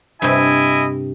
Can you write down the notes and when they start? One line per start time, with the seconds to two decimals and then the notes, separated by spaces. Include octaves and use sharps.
0.22 G2 C3 E4 D#5 G#5